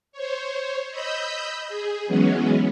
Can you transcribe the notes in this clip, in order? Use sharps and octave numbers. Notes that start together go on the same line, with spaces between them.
C5 C#5
D#5 B5 E6 G6
G#4
E3 F#3 G#3 B3 C#4